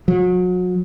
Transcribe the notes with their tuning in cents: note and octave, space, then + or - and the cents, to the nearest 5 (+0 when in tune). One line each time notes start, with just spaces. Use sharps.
F#3 -35